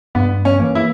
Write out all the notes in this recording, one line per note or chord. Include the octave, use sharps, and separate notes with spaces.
G2 B3
C#4
E3 A#3
E4